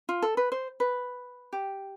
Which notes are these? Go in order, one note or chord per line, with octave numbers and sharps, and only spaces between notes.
F4
A4
B4
C5
B4
G4